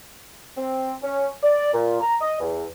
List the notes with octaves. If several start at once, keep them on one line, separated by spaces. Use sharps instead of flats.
C4
C#4
D5
A#2
A#5
D#5
E2